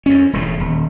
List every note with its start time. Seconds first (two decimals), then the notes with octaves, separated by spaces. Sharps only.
0.06 F2 C#4
0.33 E1 E2 A2
0.60 D#1